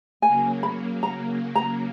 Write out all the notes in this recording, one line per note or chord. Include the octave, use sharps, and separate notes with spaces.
C#3 F#3 A#3 G#5
B5
A#5
A#5